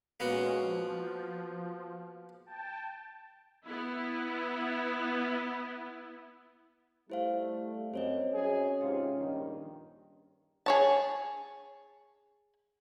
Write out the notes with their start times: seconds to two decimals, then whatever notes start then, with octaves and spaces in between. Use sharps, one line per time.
0.20 A#2 G#3 A#3 B3 C#4 F#4
0.61 F3
2.46 G5 A5
3.64 B3 E4
7.10 G3 A3 E4 C5 F5
7.94 F#2 C4 C5 C#5 D#5
8.33 F#2 C#4 G#4
8.81 G#2 C3 F4 G4
9.19 A#1 G2 D#3
10.66 G#4 C#5 A5